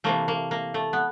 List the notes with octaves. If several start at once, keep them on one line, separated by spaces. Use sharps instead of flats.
C3 E3 A3 A#3
A#3
A#3
A3
B3